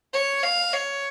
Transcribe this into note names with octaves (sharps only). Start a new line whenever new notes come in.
C#5
F5
C#5